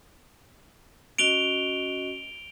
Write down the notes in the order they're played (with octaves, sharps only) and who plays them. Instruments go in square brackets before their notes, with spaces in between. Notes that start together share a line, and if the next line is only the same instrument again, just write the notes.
[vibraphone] C#4 F#4 D#5 [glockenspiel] D7 F7 G7